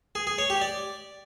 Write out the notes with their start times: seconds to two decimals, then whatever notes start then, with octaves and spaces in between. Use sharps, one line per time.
0.15 G#4
0.27 G#4
0.38 C#5
0.50 G4
0.61 D5